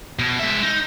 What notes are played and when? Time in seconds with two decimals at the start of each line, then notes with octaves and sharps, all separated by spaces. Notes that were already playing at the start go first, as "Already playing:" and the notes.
0.19 B2
0.40 G#3 E5
0.63 D#4